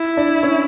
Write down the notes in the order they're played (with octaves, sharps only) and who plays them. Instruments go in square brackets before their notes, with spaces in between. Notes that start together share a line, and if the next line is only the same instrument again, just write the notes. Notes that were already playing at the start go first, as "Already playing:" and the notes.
Already playing: [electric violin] E4
[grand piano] D4 D5
C#4 C#5